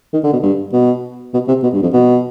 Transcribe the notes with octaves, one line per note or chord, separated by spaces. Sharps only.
D#3
D3
B2
G2
B2
B2
C3
B2
G2
F2
B2